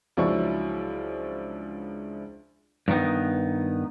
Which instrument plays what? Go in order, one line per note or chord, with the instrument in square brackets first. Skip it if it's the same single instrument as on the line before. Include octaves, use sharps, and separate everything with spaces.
[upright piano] C#2 F3 F#3 D4 E4 C#6
[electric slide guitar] G2 D#3 B3 D#4